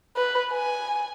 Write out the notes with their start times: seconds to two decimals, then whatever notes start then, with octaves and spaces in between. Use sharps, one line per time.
0.17 B4
0.52 G#5